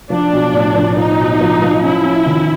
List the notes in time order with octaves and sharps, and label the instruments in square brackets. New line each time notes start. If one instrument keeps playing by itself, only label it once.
[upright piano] F3 [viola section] D4
[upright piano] B1
A2
F3
[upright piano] F3 [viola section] D#4
[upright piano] B1
F3
F3
[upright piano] C#4 [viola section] E4
[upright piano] C#4
D#3